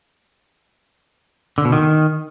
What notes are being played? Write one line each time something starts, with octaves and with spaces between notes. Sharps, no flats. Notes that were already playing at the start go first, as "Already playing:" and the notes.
D3
B2
D#3